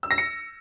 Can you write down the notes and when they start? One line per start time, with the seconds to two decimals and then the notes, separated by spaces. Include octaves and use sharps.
0.03 E6
0.11 A#6
0.18 C#7